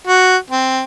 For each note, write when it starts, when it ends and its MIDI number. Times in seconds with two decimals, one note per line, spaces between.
0.07 0.37 66
0.50 0.83 60